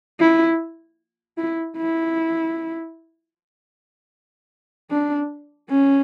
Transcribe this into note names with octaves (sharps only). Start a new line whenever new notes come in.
E4
E4
E4
D4
C#4